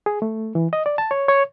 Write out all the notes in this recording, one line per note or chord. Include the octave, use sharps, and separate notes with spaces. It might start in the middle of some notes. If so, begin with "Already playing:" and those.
G#4
A3
E3
D#5
D5
A5
C#5
C#5